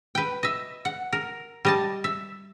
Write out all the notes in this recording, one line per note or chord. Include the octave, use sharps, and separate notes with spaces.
B4 G5
D#5 E5
F#5
A#4
G3 D#5 A5
E5